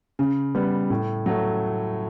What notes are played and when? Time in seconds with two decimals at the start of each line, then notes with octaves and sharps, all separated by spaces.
0.19 C#3
0.55 G3 B3
0.90 A2
1.26 F#3 A3